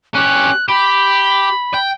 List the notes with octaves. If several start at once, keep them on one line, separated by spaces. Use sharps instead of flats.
C#4 G4 F#6
G4 B5
G5